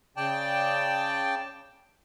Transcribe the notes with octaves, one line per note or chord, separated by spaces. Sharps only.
C#3 D5 G5 A5